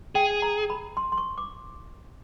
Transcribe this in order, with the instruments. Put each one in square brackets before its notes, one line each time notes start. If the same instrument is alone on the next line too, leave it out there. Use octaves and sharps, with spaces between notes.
[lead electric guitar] G#4 [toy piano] G5
[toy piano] A#5
B5
C6
C6
C#6
D6